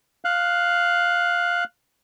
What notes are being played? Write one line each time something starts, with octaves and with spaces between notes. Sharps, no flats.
F5 F#6